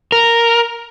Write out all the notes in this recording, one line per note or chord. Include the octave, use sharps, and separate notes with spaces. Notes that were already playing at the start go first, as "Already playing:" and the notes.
A#4